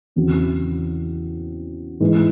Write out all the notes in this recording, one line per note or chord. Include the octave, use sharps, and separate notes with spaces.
E2 C#3 E3 C4 F#4
G#2 E3 G#3 D#4